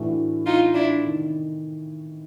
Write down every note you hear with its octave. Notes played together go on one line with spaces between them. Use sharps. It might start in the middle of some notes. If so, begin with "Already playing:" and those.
Already playing: A2 E3 A3 D4 F#4
D#4 F4
D4 E4
C3 D#3